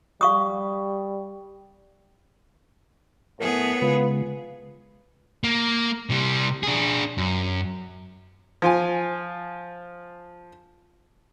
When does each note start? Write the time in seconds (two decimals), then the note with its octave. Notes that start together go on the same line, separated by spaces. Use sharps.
0.21 G3 F5 C#6 D#6
3.40 A2 B3 G#4 A#4
3.81 C#3 G#3 F4 B4
5.44 A#3
6.10 C3 G3
6.63 D4 G#4
7.18 F#2
8.62 F3 F4 G#5